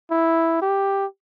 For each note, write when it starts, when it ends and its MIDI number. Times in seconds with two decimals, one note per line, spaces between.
0.11 0.60 64
0.62 1.06 67